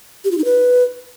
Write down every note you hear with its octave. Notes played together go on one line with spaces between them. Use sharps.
G4
F4
D#4
B4